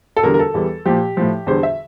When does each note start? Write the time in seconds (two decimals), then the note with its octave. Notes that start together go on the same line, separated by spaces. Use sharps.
0.16 A4
0.23 E2 D3 G3 A#4
0.34 A#4
0.39 A4
0.54 E2 E3 G3
0.86 A#2 F3 G4
1.17 A2 F3
1.47 E2 D3 G3 C5
1.63 E5